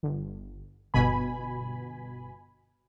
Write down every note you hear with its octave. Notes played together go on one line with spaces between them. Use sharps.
G1
G1 B2 G#5 B5